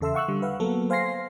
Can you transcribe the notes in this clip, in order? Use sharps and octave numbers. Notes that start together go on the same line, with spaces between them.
E2 C#3 A4 E5 C6 E6
F5 F#5 C#6 E6 F#6
D3 G3
B4 F5 F#5
F#3 A#3 B3 A4 A#4
C5 F5 G#5 C6 A#6 C7